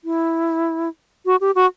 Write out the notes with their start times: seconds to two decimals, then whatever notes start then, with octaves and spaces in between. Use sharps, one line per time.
0.04 E4
1.26 F#4
1.41 G4
1.55 F#4